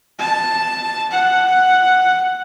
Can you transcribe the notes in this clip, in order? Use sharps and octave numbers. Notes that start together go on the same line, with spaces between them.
A5
F#5